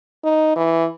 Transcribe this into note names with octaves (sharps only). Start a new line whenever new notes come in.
D#4
E3